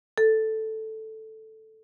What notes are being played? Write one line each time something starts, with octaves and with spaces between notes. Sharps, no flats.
A4